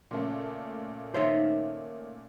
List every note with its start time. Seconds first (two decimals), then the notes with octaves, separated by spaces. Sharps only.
0.11 A#2 C#3 A3
1.14 D#3 A#3 D#4 C5 C#5 E5